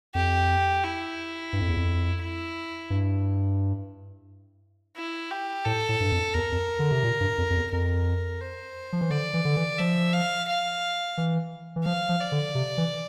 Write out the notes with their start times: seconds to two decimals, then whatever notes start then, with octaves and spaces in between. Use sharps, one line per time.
0.15 F2 G4
0.84 E4
1.53 G2
1.61 F2
1.69 E2
1.77 F2
2.22 E4
2.90 G2
4.97 E4
5.31 G4
5.66 A2 A4
5.89 A2
6.00 G2
6.12 F2
6.34 E2 A#4
6.52 F2
6.79 D3
6.91 C3
7.04 A#2
7.21 G2
7.38 F2
7.50 F2
7.56 E2
7.72 F2 A#4
8.41 C5
8.93 F3
9.01 E3
9.10 D3 D5
9.34 E3
9.45 D3
9.56 E3
9.79 F3 E5
10.14 F5
10.48 F5
11.17 E3
11.76 E3
11.85 F3 F5
12.09 F3
12.21 D5
12.32 D3
12.55 C3
12.78 E3